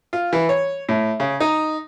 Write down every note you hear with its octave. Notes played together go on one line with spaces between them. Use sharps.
F4
E3
C#5
A2
C#3
D#4